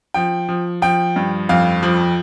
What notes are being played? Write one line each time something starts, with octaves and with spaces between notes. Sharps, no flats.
F3 G5
F3
F3 G5
G2
F2 F5
F3